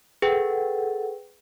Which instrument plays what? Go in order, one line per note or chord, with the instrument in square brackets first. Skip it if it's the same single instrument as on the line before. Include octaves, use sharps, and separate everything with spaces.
[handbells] G#4 B4 G5 [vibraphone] A4 F#5